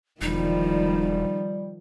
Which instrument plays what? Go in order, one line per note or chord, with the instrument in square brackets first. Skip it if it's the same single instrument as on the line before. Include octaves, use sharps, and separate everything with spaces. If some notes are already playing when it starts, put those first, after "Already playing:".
[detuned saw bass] E1 [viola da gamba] D#3 F3 [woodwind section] G3 [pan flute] D#4